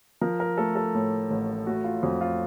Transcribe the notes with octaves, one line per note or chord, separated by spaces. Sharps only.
F3 A#4
A#4
A3 A4
A4
A2
A1
A3 F#4
F4
F2 F#4
F4